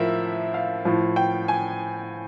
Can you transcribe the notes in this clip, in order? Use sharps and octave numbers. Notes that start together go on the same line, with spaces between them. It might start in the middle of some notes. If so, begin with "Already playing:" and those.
Already playing: A2 F3 A#4 E5
F5
A2 F3
G5
G#5